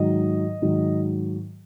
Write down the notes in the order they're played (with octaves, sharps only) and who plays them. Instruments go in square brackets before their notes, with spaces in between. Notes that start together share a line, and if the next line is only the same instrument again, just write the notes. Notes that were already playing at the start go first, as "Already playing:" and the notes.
Already playing: [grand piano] G#2 D#3 F#3 D#5
G#2 D#3 F#3